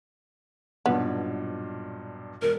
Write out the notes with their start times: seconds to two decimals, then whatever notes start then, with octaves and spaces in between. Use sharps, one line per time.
0.86 B1 G2 A#2 B3
2.42 E1 A#4